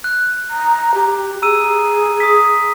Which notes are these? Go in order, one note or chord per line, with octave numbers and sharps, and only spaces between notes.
F#6
A#5
G4
G#4 A#5 E6 D#7
D#6 B6